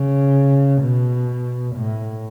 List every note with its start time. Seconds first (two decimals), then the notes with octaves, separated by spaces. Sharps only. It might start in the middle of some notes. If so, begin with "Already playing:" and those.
Already playing: C#3
0.82 B2
1.76 A2